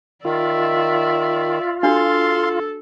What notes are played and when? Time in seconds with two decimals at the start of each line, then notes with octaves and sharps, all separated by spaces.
0.25 D#3 F4 D5 E5
1.83 D4 F#4 A4 F5 C6